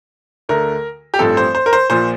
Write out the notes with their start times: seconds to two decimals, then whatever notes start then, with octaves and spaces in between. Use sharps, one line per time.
0.49 D2 D3 A3 A#4
1.14 G4
1.19 A1 G2 F3 C4 A4
1.37 C5
1.55 C5
1.66 A#4
1.73 C5
1.90 A#1 A#2 F3 C5